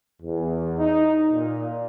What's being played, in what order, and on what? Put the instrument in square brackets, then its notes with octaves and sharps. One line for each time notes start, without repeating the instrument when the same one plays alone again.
[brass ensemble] E2
D#4
A#2